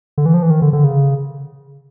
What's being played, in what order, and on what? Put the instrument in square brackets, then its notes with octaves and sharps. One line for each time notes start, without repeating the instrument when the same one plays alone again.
[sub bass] D3
E3
F3
E3
D#3
D3
D3
C#3